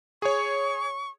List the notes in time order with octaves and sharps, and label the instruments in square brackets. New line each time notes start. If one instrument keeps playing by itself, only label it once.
[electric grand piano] G#4 C#5 [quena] C#6